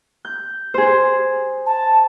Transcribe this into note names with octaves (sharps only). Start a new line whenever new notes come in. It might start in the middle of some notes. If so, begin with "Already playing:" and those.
G6
G#4 C5
A5